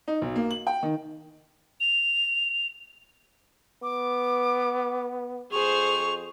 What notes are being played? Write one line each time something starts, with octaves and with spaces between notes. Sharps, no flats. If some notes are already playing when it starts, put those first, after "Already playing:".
D#4
B1
A#3
F#7
G5
D#3
F7
B3 D6
F2 G#4 C5 C#6 F7